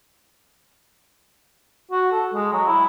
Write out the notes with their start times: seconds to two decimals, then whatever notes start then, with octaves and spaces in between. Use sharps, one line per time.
1.91 F#4
2.12 A4
2.34 G#3
2.53 F#3
2.67 E4